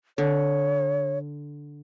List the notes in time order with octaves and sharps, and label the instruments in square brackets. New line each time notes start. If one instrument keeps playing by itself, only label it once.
[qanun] D3 [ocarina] C#5